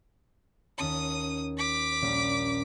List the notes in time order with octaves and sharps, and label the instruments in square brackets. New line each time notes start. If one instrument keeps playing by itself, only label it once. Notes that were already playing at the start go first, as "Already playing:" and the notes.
[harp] D#2 C#4 A5 [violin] D#6
[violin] D6 B6
[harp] A#1 G3 C#4